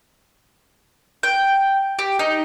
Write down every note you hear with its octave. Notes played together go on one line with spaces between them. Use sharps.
G5
G4
D#4